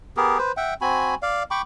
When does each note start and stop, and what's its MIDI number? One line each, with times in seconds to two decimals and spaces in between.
0.17 0.38 59
0.17 0.38 67
0.17 0.38 68
0.17 0.38 70
0.38 0.52 71
0.38 0.52 72
0.57 0.74 76
0.57 0.74 78
0.57 0.74 79
0.81 1.15 60
0.81 1.15 66
0.81 1.15 80
0.81 1.15 83
1.22 1.43 74
1.22 1.43 77
1.51 1.62 79
1.51 1.62 83
1.51 1.62 85
1.51 1.62 86